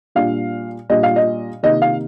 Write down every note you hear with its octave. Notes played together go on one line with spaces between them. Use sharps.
A#2 G3 D4 F5
A#2 G3 D4 D#5
F5
D#5
C3 D#3 A#3 D#5
F5